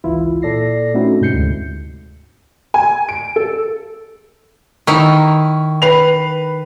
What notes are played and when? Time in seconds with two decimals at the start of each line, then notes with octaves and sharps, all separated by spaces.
0.04 G#1 C#2 E3 E4 F4
0.42 A#2 A4 D5 A#6 C7
0.94 A3 C4 C#4 D#4 E4 F#4
1.21 G#2 C3 G#3 G6 C7 C#7
1.33 D2
2.74 G#5
3.09 D7
3.36 A4
4.87 D#3 E4 C#6
5.82 B4 C7 F7